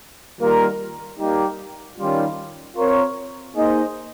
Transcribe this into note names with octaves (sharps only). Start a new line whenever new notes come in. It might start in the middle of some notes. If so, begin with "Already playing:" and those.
D#3 G3 A#3 F4 A#4
G3 A#3 D#4 G4
D#3 G3 C#4 F4
C4 F4 A#4 C#5
A#3 D#4 G#4 C5 D#5